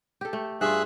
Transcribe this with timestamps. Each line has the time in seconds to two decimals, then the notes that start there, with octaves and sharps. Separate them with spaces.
0.21 G4 A4
0.33 A3
0.61 G2 F4 G#4 E5 F#6